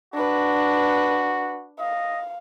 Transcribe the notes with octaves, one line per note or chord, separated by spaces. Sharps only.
D4 F#4 B4
D#5 F5